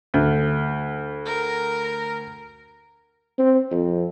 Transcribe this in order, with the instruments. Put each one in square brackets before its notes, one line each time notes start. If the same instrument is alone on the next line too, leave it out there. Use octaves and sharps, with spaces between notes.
[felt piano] D2
[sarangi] A#4
[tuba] C4
F2